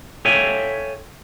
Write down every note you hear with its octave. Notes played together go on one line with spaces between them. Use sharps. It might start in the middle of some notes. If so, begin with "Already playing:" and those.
A4 C#5 E5 F5 G5 G#5